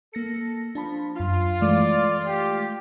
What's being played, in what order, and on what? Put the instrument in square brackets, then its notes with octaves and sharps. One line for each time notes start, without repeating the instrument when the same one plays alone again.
[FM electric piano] A#3 A#6 C#7 [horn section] A4
[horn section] F3 [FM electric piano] D4 A5 B5
[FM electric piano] F#2 C6 [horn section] F4
[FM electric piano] E3 G#3 A3 [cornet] D5
[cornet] G4